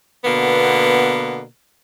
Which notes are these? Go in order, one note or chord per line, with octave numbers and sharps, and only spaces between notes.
B2 D3 A#3 B3